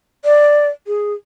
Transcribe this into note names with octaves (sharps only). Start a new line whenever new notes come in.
D5
G#4